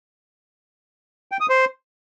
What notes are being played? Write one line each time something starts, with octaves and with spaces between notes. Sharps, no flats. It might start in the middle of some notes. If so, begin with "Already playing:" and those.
G5
D#6
C5